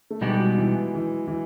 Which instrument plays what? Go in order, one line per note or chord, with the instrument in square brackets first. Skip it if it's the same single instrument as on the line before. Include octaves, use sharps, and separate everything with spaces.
[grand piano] A3
[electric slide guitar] B2 G3 B3 D#4 G4 [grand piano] G#3
[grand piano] F#3
E3
E3
E3